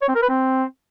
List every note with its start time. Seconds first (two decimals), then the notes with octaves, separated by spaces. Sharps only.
0.01 C#5
0.08 C4
0.15 A#4
0.22 B4
0.29 C4